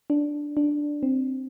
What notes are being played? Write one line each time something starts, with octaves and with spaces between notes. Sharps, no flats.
D4
D4
C4